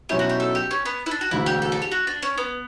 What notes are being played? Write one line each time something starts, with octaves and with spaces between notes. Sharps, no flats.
B1 B2 F#3 C#4 E4 G4
F#4
G4
A4
G4
C#4
B3
E4
D4
F#4
E1 D2 D3 E4
G4
A4
A4
G4
F#4
D4
C#4
B3